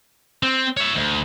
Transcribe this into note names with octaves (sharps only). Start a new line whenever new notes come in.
C4
C#5 E5
D2